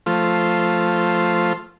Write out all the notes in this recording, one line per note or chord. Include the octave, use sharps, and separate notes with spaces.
F3 A3 F4 C5